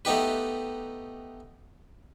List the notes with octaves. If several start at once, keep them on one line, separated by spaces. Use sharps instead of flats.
A3 B3 D#4 G4 B4